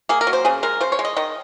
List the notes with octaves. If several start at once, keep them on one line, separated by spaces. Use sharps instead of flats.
A#3 G#4
A#4
F#3
C5
C#3 G#4
G#3 A#4
C#3 C5
C#5
G#3
D#5
D#3 D#5